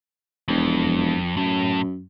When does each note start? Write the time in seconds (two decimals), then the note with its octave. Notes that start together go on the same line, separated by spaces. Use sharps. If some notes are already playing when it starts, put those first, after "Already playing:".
0.48 E1 F2
1.37 F#2 A2